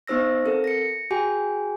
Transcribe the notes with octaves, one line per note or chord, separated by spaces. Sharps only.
B3 D#4 C5 E6 A#6
C4 A4 A#4
A#6 C#7
F#4 G#4 G5 G#5